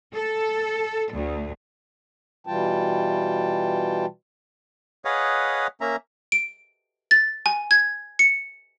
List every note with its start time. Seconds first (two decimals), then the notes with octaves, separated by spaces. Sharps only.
0.13 A4
1.13 D2
2.47 B2 E3 G3 F4 G5 A5
5.05 G#4 B4 C#5 D#5 F5 F#5
5.81 A#3 C#4 E5 A#5
6.32 D7
7.11 A6
7.46 G#5
7.71 G#6
8.19 C#7